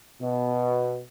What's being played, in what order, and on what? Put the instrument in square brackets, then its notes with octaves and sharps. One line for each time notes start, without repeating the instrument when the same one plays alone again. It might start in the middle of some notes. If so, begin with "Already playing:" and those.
[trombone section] B2